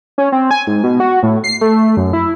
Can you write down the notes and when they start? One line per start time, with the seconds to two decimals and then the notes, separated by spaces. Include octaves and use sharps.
0.18 C#4
0.32 C4
0.51 G#5
0.67 G#2
0.84 B2
1.00 F#4
1.23 A2
1.44 C7
1.61 A3
1.97 F#2
2.13 E4